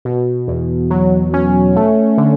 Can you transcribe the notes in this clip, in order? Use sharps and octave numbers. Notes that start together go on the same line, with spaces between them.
B2
E2
F#3
C#4
A3
D3